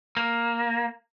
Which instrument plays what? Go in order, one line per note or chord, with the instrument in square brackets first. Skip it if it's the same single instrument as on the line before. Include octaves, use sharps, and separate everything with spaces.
[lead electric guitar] A#3